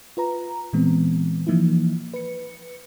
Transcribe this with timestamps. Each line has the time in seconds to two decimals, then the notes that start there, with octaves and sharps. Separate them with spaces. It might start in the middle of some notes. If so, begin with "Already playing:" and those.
0.17 F4 B4 A#5
0.73 A#2 E3 G#3 B3 C4
1.47 E3 F3 A#3 D#4 E4
2.14 B4 C#7